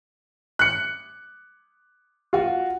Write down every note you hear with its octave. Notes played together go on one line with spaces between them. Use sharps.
F#6 C#7
F4 F#4